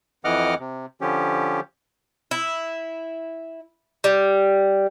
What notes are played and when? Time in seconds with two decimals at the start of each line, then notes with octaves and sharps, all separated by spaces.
0.25 F2 E3 D#5 F#5 D6 F6
0.60 C3
1.01 D3 F3 C#4 G4
2.31 E4
4.04 G3